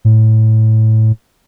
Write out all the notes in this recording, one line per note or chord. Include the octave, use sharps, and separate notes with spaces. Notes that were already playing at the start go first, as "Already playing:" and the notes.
A2